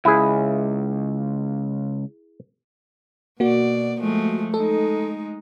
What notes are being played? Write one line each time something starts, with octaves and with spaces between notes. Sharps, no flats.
C#2 E4 G#4
B2 A#3 F#4 D5
F3 G#3 A3
G#3 D#4 A4